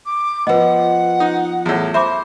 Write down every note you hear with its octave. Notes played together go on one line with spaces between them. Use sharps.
D6
F3 B3 B4 D#5 F#5
D#4
E2 A2
C5 E5 B5 D6